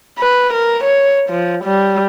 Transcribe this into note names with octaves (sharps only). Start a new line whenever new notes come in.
B4
A#4
C#5
F3
G3